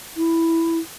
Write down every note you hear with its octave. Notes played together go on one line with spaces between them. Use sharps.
E4